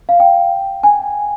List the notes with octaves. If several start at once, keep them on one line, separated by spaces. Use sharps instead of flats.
F5
G5
G#5